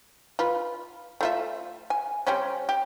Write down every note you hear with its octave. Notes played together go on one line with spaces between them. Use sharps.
F4 B4
A3 F4 E5
G#5
G3 C4 C#4
G4